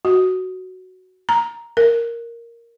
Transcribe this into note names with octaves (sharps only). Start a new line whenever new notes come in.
F#4
A#5
A#4